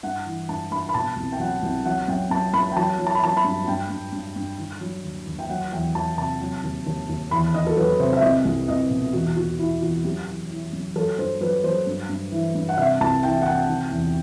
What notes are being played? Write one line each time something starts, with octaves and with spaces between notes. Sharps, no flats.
G2 F#5
E3
G2 A5
G2 B5
B5
B2 A5
C2
G5
F#3 F#5
C2
F#3 F#5
F#2 G5
F#2 A5
F#2 B5
G5
F#3 A5
F#3
A5
B5
F#3 A5
B5
G2
G2 G5
G2
G2
G2
D#3
F#3
D#2
D#2
G5
F#3 F#5
E2 G5
F#3 A5
C3 A5
F#3
D#2
D#2
D#2
E2 B5
D#3 D#5
A4
F#3 B4
C3 C5
E5
C2 D#5
C2
C2 D#5
B2
E2 F#4
D#3 F#4
E2 E4
E2 F#4
F#2 G4
E3
E3
F#2
F#3 A4
G2 C5
F#3 B4
F#3 C5
G2
G2
E3
G2
F#5
C3 E5
C2 A5
E3 G5
F#5
C3 G5
D#3
E2